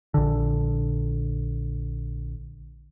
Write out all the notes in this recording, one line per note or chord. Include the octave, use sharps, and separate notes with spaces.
A#1 D3